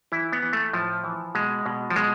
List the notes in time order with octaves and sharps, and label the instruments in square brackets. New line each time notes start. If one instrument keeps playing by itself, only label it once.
[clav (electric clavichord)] E3 E4
B3
E3
A3
A2 F3
E3
B2 G#3
B2
F3
B2 G#3